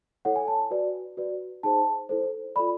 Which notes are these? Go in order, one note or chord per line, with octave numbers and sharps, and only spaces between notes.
E4 A4 C#5 F#5
G#5
A5
F#4 B4 D5
F#4 B4 D5
D#4 G#4 C5 A5
E4 A4 C5
F4 A4 D5 B5